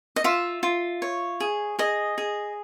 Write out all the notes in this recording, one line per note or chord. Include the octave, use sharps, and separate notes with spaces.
D#5
F4 E5
F4
C#5
G#4
G#4 D#5
G#4